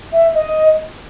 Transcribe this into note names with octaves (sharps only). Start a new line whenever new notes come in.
E5
D#5